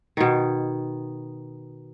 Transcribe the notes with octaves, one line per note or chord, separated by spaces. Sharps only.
B2 D#3